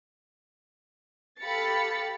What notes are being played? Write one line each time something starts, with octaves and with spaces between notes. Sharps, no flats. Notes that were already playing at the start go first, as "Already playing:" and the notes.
G4 A4 F5 B5 A6 C#7